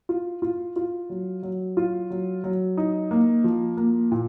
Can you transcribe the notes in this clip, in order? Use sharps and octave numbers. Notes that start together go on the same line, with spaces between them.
F4
F4
F4
F#3
F#3
F4
F#3
F#3
D#4
A#3
F3
A#3
A#2